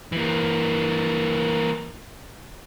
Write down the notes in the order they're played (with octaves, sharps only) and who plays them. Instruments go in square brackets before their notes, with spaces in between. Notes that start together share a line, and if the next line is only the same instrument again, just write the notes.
[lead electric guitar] E3 A#3